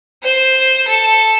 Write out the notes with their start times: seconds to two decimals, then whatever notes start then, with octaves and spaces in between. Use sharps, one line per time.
0.23 C5
0.88 A4